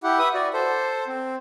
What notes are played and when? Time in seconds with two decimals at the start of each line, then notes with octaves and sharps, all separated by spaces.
0.03 E4 G4 F#5
0.19 B4 E5 D#6
0.34 F#4 D5
0.54 A4 C5
1.07 C4